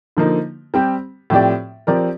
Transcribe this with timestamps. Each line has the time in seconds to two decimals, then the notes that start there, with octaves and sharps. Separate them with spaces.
0.17 D3 F3 A#3 D#4
0.74 G3 C4 G4
1.30 A2 F3 C4 G4 D5
1.87 F3 C4 G4 A#4 D5